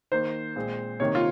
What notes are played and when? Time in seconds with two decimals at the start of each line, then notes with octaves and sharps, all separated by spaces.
0.12 D#3 A#3 C5
0.56 A#2 G#3 C4
1.00 C3 D#3 A#3 C#5
1.15 F4